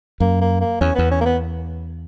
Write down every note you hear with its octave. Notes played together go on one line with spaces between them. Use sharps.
F#2 A#3
A#3
A#3
E2 C#4
E2 B3
C#4
A#3
B3